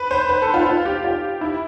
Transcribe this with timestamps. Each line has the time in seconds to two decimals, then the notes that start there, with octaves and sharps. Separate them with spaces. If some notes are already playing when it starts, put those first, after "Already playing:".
Already playing: B4
0.11 C5
0.29 B4
0.42 A4
0.54 F4
0.66 F4
0.85 G4
1.04 F4
1.41 E4